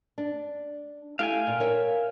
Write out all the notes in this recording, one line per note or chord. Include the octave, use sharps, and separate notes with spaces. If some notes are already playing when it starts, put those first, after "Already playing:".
D4
A3 E4 G4 F5 G5 G#5
A#2
A#4 C#5 E5